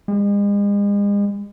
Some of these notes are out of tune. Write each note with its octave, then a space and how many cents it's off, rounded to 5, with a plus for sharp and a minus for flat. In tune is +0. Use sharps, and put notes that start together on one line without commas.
G#3 -40